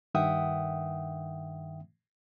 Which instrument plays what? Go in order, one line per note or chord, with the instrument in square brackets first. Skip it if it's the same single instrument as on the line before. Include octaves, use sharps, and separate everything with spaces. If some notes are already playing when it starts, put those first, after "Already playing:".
[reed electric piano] G2 D#3 E5 F#5 G5 D#6